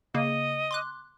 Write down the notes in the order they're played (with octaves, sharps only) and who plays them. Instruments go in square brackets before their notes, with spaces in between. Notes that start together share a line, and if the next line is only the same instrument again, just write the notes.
[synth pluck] C#3 A#3 [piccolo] D#5
[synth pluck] C6 D6 F#6